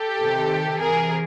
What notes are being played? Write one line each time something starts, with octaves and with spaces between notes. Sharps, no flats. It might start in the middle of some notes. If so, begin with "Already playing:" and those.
Already playing: G4 A4
C3 D#3
C3 E3 G#4 A#4